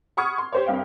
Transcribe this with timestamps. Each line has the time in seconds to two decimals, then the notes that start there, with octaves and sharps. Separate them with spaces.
0.17 F#5 B5 C#6 D#6 F6 G#6
0.38 C6
0.52 G4 C5 C#5
0.66 C2 G2 F5 G5